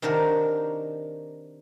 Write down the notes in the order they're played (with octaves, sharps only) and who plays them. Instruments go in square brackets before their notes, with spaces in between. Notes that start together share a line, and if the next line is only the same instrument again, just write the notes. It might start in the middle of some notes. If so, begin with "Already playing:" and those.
[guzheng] C3 D#3 D4 F#4 A#4